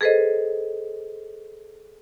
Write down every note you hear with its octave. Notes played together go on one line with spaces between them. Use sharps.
G#4 A4 B4 C5 D#5